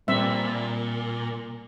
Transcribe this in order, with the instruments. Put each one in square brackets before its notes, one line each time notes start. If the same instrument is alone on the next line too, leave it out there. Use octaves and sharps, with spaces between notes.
[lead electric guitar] A#2 [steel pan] G3 C4 E5